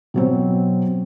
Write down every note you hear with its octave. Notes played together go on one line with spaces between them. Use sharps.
B2 F#3 C4